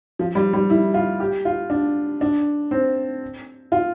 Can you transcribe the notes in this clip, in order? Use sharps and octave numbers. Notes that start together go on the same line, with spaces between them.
F3
G3
G3
E4
F4
G4
F4
D4
D4
C4
F4